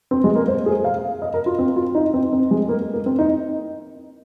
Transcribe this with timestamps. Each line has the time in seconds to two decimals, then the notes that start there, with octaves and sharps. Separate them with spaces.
0.11 C4
0.24 G#3
0.36 A#3
0.48 C5
0.66 G#4
0.84 F5
1.22 D#5
1.34 A#4
1.46 F4
1.59 C4
1.76 F4
1.95 D#4
2.14 C4
2.32 C4
2.51 G#3
2.69 A#3
2.94 A#3
3.06 C4
3.19 D#4